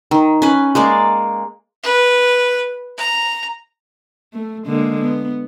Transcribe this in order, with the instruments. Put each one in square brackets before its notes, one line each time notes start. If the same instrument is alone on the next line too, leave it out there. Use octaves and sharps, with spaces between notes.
[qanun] D#3
C#4 B4
G#3 A#3 D5
[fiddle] B4
A#5
[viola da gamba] A3
D3 G#3 A#3
B3